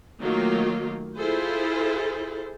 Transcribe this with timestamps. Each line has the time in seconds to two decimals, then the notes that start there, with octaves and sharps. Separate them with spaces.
0.21 D#3 F#3 A3 A#3 F4
1.16 E4 F4 G#4 A4 C5